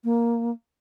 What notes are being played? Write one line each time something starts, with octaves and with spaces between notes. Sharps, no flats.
A#3